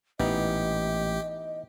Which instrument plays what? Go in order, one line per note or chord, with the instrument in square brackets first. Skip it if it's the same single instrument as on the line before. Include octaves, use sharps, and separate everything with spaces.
[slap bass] A1 A#2 [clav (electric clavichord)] E3 B3 D#4 [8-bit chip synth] G4 [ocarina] D#5